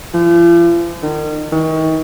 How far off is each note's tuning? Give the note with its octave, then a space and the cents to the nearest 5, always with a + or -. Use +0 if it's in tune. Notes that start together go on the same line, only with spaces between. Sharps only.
F3 -45
D#3 -35
D#3 +35